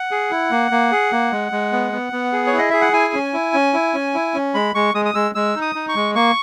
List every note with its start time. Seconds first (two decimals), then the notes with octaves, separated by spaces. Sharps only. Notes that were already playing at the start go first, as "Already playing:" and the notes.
Already playing: F#5
0.11 G#4
0.31 E4
0.51 A#3
0.71 A#3
0.92 G#4
1.12 A#3
1.32 G#3
1.52 G#3
1.72 B3
1.93 B3
2.12 B3
2.33 G#4
2.47 C#5
2.53 E4
2.58 D#5
2.70 G#4 E5
2.81 F#5
2.93 E4 G#5
3.14 C#4
3.34 E4
3.54 C#4
3.74 E4
3.94 C#4
4.14 E4
4.34 C#4
4.54 G#3 B5
4.75 G#3 C#6
4.94 G#3 D#6
5.05 D#6
5.15 G#3 E6
5.35 G#3 E6
5.56 D#4
5.62 D#6
5.75 D#4
5.89 C#6
5.95 G#3
6.15 A#3 C#6